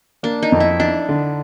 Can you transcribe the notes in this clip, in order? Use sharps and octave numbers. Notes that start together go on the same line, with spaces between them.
A#3 D4
D#4
F2
E4
D4 D#4
D3